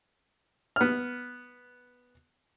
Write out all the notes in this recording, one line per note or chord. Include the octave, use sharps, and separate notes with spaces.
B3 F6